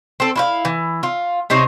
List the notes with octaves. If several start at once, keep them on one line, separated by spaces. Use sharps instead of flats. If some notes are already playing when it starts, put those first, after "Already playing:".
C4 A4
E4 F4 F5
E3
F4
C3 D#4 C5 C#5